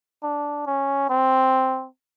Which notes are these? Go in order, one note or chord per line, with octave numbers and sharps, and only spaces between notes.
D4
C#4
C4